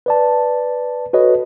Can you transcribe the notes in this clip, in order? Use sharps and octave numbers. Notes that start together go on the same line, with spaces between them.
B4 D5 A5
F#4 A4 B4 C#5 D#5